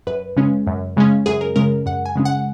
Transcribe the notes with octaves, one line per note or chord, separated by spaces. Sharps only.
F#2 B4
C#3 G#3 C#4
F#2
C#3 G#3 C#4
F#2 G#4
A#4
C#3 G#3 C#4 A#4
F#2 F#5
G#5
C#3 G#3 C#4
F#5